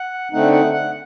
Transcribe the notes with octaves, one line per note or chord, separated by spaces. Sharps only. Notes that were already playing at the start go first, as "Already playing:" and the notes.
Already playing: F#5
D3 A3 C4 D#4 F#5
F#5
F#5